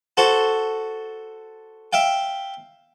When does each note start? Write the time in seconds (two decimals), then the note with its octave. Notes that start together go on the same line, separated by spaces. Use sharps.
0.17 F#4 A4 C5
1.93 E5 F5 G5